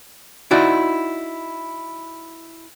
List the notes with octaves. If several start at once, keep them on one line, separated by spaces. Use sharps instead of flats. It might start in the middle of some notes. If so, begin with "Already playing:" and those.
D#4 E4 F#4 D5